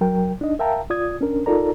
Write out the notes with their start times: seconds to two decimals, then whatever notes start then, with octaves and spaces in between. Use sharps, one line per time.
0.01 F#3 A#4 G5
0.41 D4 D#4 D#5
0.59 A#4 E5 F5 G5 A5 A#5
0.90 F4 D5 D#6 G#6
1.21 C#4 D4 A#4
1.46 D#4 F4 A4 A#4 D5 A#5